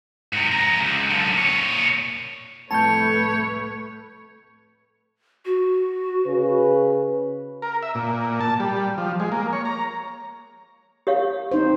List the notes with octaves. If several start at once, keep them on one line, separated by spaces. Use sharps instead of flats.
G#2 C3
F2 A#5
C#2
F#2 D3
A#2 C#5
C2 F2 A2 A3 B4 C#5 A5 G6
F#4
C#3 B4
A#4
E5
A#2
A5
G3
F3
G#3
A#3
C#5
A#5
G4 C#5 F5
C4 D#4 C5